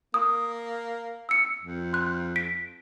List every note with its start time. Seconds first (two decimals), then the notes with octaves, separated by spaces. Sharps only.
0.14 A#3 D#6
1.29 E6 C#7
1.61 F2
1.93 C6 F#6
2.36 B6 D7